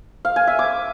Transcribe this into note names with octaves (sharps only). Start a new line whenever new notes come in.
F5
G#5
E5
D6